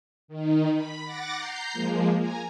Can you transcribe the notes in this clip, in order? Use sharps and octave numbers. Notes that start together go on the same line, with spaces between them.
D#3 D#4
B5
F#5 D6 A6 A#6
A#5 G6 C7
F3 G#3 A#3
G#5 A#5